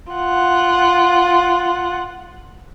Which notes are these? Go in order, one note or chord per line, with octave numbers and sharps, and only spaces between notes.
F4 F#5